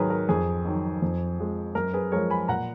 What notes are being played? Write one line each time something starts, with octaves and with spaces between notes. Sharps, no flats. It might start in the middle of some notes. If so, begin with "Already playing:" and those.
Already playing: G#2 D#3 F#3 G#4 A#4 B4 C#5
A#4
F2 G#4
D#3 F#3
F2
F3 G#3
F#2 A#4
G#4 B4
F3 G#3 A#4 C#5
G#5 B5
A#2 F#5 A#5